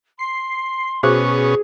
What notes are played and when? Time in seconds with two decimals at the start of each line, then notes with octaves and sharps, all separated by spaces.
0.19 C6 C7
1.03 B2 C#4 F#4 G#4 C5 C#6 D6